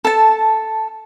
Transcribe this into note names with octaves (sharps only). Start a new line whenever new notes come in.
A4 A5